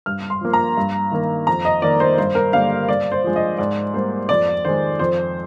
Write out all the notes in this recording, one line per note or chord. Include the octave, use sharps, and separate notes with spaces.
G2 F6
C6
F3 A#3
A#5
G2
D#3 A#3
F2 A#5
D#5
D#3 A#3 D5
C5
G2 C5
A#4
D3 G3 A#3 F5
G2 D5
C5
F3 G#3
D#5
G#2 D5
G3 A#3 C5
F2 D5
D#3 G#3 C5
F2 C5